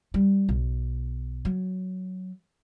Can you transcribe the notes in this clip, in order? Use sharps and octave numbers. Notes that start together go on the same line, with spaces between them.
G3
B1
F#3